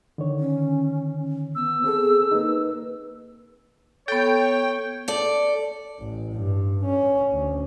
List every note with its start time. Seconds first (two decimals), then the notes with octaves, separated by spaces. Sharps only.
0.18 D3 D#3 C#5
0.40 C#4
1.55 B3 E6
1.84 C4 G#4 A4
2.32 A#3 D#4 B4
4.08 B3 A4 C#5 G5
5.08 A4 D5
5.99 A1
6.33 G2
6.85 C#4
7.32 D2